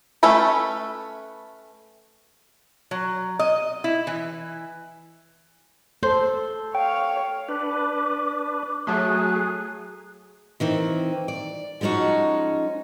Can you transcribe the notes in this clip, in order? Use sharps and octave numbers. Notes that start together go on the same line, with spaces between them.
A3 C#4 A4 B4
F#3
D#5
E4
E3
A4 C5
C#5 F5 G5
D4 B4 D6
F#3 A3 G#4 F#6
D#3 E3 C4
D5
F3 G#3 C#4 D#4 F#4